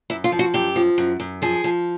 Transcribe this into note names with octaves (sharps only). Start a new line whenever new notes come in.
F#2 E4
F4
F3
F#4
F#2 G4
F3
F#2
F#2
F3 G#4
F3